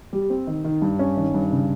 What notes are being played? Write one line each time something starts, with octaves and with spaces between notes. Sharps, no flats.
G3
C4
D#3
D#3
G2
C#4
D#3
G2
C#3